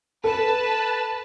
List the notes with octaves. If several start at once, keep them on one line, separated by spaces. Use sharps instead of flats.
A4 B4 A5